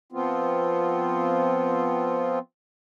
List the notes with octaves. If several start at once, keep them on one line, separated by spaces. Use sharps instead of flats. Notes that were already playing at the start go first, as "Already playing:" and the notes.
F3 B3 C4 F4